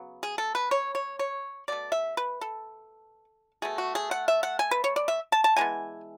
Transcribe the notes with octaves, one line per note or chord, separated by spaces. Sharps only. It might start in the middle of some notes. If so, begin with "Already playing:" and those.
Already playing: C#3 F#3 B3
G#4
A4
B4
C#5
C#5
C#5
B2 A3 D5
E5
B4
A4
B2 A3 G#4
F#4
G#4
F#5
E5
F#5
G#5
B4
C#5
D5
E5
A5
A5
E3 G#3 B3 G#5